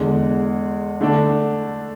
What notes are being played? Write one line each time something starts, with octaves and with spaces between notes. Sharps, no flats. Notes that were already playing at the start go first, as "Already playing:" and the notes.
Already playing: E2 D3 G#3
D3 A3 D4